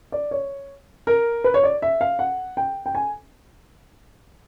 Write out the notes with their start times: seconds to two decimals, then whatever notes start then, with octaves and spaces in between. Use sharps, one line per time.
0.12 D5
0.31 C#5
1.07 A#4
1.44 B4
1.54 C#5
1.63 D5
1.82 E5
2.01 F5
2.19 F#5
2.57 G5
2.86 G5
2.95 G#5